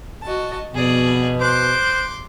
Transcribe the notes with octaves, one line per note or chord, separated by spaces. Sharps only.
F#4 D#5 A5
F2 B2 G#4 D5
C5 C6 D6 F#6